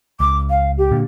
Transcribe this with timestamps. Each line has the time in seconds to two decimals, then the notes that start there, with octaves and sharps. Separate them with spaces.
0.20 C#2 D6
0.50 F5
0.78 G4
0.91 A#2 D3